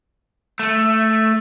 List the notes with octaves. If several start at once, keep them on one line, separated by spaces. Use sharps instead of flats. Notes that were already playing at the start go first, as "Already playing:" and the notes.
A3